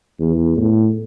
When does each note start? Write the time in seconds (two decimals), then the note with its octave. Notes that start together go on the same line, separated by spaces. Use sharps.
0.20 E2
0.57 A2